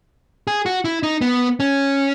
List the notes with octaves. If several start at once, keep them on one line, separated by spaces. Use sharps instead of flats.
G#4
F#4
E4
D#4
B3
C#4